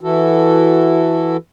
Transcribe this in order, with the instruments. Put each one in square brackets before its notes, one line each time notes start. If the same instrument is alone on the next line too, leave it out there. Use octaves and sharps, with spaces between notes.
[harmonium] E3 E4 F#4 A4